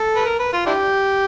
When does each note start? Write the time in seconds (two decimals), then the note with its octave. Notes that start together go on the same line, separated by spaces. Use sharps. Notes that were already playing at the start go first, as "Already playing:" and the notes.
Already playing: A4
0.16 B4
0.25 A#4
0.39 B4
0.53 F4
0.66 D4 E4 G4